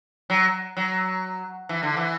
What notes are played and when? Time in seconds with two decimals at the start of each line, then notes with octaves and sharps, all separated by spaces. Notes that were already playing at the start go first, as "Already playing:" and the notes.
0.30 F#3
0.77 F#3
1.69 E3
1.83 D3
1.97 E3